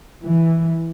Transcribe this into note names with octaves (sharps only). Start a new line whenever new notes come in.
E3